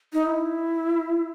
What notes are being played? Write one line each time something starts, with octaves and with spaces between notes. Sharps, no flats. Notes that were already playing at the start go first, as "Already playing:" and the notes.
D#4
E4